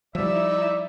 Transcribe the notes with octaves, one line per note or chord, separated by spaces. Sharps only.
F3 G3 D#4 E4 D5 E5